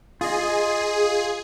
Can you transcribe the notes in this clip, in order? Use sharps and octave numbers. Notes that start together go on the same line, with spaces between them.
F4 G#4 D#5